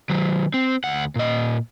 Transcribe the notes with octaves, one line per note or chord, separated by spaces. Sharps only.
D#3 F#3
C4
D2 F#5
A#2 D#5